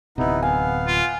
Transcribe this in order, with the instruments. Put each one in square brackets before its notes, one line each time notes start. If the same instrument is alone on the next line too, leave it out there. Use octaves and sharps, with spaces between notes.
[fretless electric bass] D1 C3 [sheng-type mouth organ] B3 D#4 E4
[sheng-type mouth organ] B3 F5 [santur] G#5
[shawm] F4